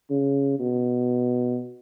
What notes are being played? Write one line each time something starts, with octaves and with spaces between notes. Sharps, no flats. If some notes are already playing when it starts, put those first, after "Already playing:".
C#3
B2